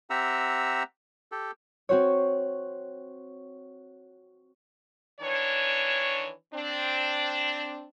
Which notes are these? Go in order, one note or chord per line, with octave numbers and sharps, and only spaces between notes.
C4 G4 E5 F#5 A#5 E6
G4 A4
C4 F#4 C5 C#5
D#3 E3 D4 C#5
C4 D4